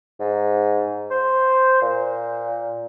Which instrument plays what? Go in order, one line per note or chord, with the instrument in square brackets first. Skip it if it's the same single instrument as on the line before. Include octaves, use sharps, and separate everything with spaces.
[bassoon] G#2
C5
A#2